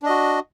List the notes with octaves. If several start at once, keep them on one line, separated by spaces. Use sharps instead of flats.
D4 F#4 D#5